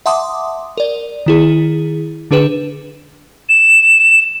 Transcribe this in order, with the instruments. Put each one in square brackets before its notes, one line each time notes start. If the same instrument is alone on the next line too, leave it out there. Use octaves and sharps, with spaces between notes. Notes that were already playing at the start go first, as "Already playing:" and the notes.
[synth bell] E5 F#5 A5 C6 D6 D#6
A#4 D5
D#3 E4 G#4
D3 D4 G#4 B4 E7
[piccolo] E7